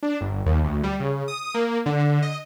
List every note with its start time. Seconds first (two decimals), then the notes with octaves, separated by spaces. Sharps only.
0.03 D4
0.21 G1
0.46 D#2
0.64 D2
0.83 G3
1.00 C#3
1.28 D#6
1.54 A#3
1.86 D3
2.00 D3
2.22 D#5